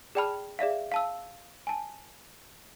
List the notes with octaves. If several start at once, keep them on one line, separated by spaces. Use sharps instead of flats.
G#4 D5 G5 A5 B5 F6
G#4 D5 E5 F5
F5 A5 E6
G#5 A5